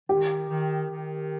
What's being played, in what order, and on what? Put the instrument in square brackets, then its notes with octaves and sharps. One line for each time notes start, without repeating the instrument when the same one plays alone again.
[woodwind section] D#3 [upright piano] G4
[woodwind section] D#3
D#3